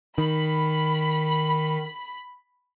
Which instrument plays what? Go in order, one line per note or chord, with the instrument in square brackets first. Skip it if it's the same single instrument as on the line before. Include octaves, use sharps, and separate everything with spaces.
[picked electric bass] D#3 [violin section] B5